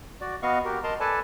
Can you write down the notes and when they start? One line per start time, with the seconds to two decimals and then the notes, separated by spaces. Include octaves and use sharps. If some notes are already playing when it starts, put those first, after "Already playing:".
0.21 F#4 D5
0.43 B3 F#4 D#5 F5 C#6
0.65 F#4 G4 A#4
0.84 A#4 D#5 A5 A#5 C6
1.00 A4 B4 D5 G#5 A5